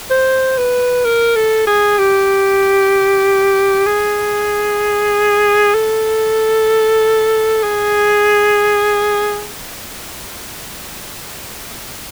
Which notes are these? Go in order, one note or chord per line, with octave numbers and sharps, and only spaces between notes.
C5
B4
A#4
A4
G#4
G4
G#4
A4
G#4